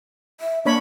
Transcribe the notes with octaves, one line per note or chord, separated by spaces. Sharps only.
E5
A#3 D4 C#5 B5